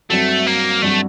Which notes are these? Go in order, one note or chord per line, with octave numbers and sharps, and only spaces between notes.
G2 F#3 A3 C4 F#4
A#3
G2 F#3 A3 C4 F#4